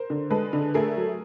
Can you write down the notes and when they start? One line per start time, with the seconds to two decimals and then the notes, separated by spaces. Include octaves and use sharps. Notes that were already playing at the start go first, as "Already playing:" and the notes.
Already playing: A#4 C5
0.10 D3
0.30 G#3 A4 B4
0.53 D3
0.74 A3 G#4 A#4
0.97 F#3